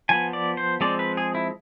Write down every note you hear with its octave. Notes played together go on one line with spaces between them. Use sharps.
F3 B3 G#5
D5
C5
F3 G#3 C4 D5
B4
G#4
E4